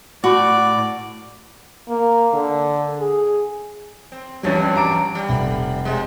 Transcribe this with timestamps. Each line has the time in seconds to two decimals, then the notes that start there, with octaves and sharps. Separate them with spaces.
0.24 A2 F#4 D5
1.88 A#3
2.33 D3
2.99 G#4
4.12 C4
4.43 E2 G2 F#3 G3 C#4
4.76 A#5 D6 D7
5.15 G3
5.29 F1
5.85 C3 G#3